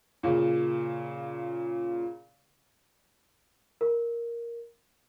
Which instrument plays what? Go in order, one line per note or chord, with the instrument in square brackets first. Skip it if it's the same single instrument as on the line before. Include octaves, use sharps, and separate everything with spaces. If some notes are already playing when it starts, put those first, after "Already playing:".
[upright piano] A#2 C#3
[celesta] A#4